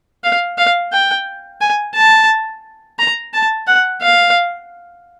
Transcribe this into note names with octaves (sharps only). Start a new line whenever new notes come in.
F5
F5
G5
G#5
A5
A#5
A5
F#5
F5